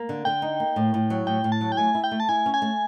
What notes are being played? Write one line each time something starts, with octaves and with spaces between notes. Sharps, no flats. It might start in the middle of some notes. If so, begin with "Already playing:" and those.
Already playing: A#3
D3
D3 G5
D#4
A#3
A2
A2
F#3
A2 G5
A2
A5
F#3
G5
A3 G#5
E4
G5
A3
A5
E4 G#5
C#4
G#5
A3